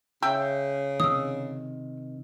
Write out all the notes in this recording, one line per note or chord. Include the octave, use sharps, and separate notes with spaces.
C#3 E5 G5
C3 D#3 D#6 E6